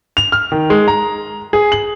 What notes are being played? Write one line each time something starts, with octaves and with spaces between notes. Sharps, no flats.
F7
F6
D#3
G#3
A#5
G#4
F#7